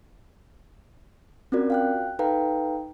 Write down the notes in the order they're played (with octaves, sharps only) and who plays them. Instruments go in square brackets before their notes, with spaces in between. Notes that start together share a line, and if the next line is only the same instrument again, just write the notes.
[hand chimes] C4 C#4 F4 F#4 A#4 D5
F5 G5 F#6
D#4 A4 B4 F5 G5 A#5